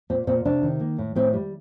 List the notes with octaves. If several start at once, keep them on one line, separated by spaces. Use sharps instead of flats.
A#2 C4
A#2 C4
C3 D4
D#3
A#3
A2
A2 C4
G3